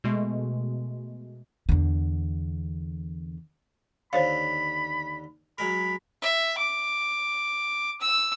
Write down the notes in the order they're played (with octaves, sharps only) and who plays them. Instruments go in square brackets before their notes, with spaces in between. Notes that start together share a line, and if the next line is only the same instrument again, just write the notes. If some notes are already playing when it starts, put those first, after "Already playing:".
[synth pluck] B2 G#3 A3
[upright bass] E2 D3
[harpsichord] D#2 D3 [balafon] C5 C#5 F5 [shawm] B5
[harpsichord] F#3 G#3 A#4 [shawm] B5
[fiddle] E5
D6
E6